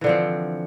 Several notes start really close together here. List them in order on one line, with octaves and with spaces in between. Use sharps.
E3 D3 F3 C4